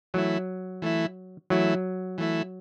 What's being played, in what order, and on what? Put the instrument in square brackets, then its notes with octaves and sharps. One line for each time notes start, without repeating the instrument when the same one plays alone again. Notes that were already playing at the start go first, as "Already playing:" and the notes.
[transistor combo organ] E3 A3 E4 [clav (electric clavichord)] F#3
[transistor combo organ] E3 A3 E4
[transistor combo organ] E3 A3 E4 [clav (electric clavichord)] F#3
[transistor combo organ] E3 A3 E4